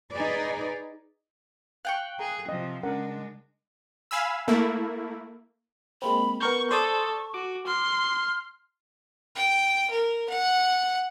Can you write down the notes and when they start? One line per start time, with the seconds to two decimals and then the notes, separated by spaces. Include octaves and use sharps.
0.12 D#4 G#4 B4 D5
1.85 F5 G5 C#6 F#6
2.19 G#4 A#5
2.49 C3 F3 D#5
2.83 C#3 G#3 D4 A#4 F#5
4.11 F5 G#5 B5 E6
4.48 A3 A#3 E4
6.02 G#3 A#3 C4 B5
6.41 B3 A#4 C#6 G6
6.71 A4 C5 D5 C#6 D#6
7.34 F#4 D6
7.66 C6 F6
9.36 G5
9.90 A#4
10.29 F#5